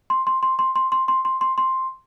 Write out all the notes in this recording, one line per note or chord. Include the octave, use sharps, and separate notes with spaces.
C6
C6
C6
C6
C6
C6
C6
C6
C6
C6